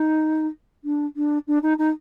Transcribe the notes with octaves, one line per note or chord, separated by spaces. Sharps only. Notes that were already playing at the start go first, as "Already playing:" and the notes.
Already playing: D#4
D4
D4
D4
D#4
D#4